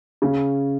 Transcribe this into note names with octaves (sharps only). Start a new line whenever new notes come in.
C#3